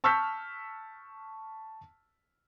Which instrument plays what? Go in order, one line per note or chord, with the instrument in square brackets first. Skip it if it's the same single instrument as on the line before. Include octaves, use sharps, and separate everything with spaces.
[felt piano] A5 C#6 E6 F6 G6 B6